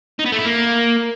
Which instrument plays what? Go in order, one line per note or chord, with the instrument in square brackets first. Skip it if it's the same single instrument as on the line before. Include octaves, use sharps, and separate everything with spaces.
[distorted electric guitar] D#4
B3
A3
E4
A#3